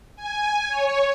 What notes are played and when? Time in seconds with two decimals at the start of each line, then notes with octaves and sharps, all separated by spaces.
0.16 G#5
0.68 C#5